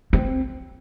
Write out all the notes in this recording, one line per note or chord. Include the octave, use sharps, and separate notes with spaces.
C4